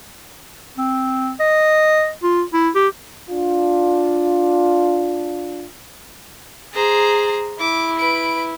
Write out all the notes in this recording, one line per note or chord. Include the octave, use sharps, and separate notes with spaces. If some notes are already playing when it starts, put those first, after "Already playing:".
C4
D#5
F4
E4
G4
D4 F4
G#4 C5 A#5
E4 D6
B4 D7